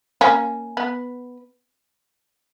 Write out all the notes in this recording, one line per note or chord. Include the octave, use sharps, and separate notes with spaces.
A#3 C#4
B3